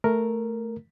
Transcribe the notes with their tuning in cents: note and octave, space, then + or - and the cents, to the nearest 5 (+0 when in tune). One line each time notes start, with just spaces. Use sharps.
A3 +0 A#4 +0